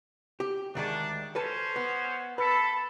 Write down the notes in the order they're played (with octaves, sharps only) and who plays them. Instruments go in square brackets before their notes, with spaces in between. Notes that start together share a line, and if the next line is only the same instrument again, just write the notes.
[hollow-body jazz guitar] G4
[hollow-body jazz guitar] D2 D#3 G#3 [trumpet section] D4
[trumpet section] C#4 C5 [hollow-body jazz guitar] A4 B4 A5
[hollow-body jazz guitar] B3
[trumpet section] A4 [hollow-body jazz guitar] B4 [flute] B5